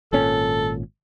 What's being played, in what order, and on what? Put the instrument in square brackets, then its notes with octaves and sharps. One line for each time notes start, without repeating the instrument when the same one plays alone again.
[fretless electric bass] G#1 A#2 C#4 [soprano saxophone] A4